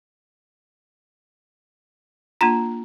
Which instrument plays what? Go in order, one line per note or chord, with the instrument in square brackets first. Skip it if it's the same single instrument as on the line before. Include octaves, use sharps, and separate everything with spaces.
[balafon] A#3 D4 F4 [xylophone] A#5 E7